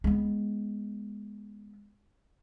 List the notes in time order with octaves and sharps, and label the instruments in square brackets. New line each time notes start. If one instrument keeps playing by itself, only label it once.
[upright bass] G#3 B3